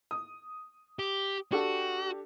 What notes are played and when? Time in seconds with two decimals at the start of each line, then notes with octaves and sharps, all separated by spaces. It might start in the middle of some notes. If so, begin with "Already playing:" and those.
0.11 D#6
0.99 G4
1.52 D4 F#4 G4 A4